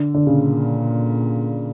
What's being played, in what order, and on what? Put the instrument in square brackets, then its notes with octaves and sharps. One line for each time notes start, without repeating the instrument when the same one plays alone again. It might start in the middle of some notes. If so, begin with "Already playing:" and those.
Already playing: [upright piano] D3
D3
[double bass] A#2 [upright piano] C#3